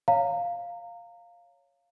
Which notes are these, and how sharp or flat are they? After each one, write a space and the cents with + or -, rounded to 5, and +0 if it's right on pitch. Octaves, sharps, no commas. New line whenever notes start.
C#5 +0 F5 +0 A#5 -25